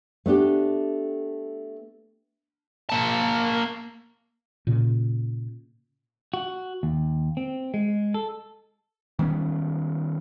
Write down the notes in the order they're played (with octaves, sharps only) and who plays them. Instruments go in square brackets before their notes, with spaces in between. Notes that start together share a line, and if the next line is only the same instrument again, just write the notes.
[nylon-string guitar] A3 B3 D4 G4
[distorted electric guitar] A#3 A5
[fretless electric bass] A#2 C#3
[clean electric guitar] F#4
D#2
C4
G#3
A4
[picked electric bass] D#3 G3 B3 C#4